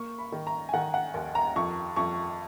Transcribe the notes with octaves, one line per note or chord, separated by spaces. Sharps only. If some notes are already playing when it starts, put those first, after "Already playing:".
Already playing: A#3 C#6
B5
D#3
A#5
G#5
D#3 F#5
F#5
D#2
A#5
F2 C#6
F2 C#6